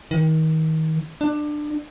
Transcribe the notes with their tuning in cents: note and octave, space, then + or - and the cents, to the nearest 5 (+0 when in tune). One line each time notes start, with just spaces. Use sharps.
D#3 +30
D4 +20